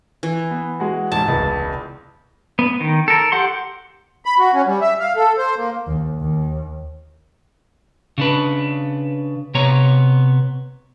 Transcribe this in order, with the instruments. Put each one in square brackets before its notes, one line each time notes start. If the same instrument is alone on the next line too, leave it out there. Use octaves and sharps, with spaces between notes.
[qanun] E3
[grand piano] B3
G#3 F#4
[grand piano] A1 G#2 [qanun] A5
[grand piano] E1 C#2
[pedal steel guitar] B3
D#3
A4 A#4
G4 F#5 C6
[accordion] B5
F#4
C#4
G3
E5
F5
A4
C5
A#3
[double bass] D#2
D#2
[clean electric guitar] C#3 D4 B4
C3 B3 C#5 A#5